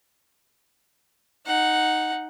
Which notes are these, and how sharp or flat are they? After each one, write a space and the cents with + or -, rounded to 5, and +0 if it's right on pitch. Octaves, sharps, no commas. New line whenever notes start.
D#4 +0 F#5 +0